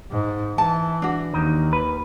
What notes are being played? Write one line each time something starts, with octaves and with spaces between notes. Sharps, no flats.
G#2
E3 A5
D4 F#4
D#2 D#3
B4